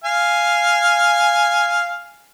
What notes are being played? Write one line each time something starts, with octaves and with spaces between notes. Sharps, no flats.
F5 G#5